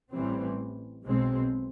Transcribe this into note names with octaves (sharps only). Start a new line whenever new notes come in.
A1 A2 E3 G3 C4
B1 B2 G#3 C4